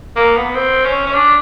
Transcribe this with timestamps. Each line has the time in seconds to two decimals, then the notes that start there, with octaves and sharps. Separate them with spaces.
0.16 A#3
0.36 B3
0.55 C4
0.85 C#4
1.06 C#4
1.14 D4